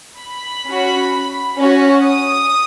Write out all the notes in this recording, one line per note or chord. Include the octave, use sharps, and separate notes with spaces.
B5
C#4 F#4
C#4 F#4
D#6